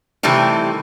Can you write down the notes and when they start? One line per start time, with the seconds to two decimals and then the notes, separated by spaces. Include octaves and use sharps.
0.23 C3 D#3 E3 G3 A3 C4